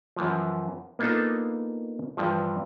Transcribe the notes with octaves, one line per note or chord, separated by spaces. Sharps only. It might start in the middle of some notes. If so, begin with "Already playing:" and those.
F#2 E3 F3
A#3 B3 D4 D#4 F4 A4
G2 E3 F3